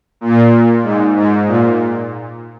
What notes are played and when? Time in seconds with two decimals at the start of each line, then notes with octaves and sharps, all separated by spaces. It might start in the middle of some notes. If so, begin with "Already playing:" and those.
0.21 A#2
0.83 G#2
1.16 G#2
1.47 A#2